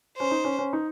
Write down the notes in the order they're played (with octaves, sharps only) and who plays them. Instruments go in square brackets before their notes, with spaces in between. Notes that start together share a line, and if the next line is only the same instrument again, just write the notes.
[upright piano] C#4 [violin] C5
[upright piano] D#4
C#4
C#4
D#4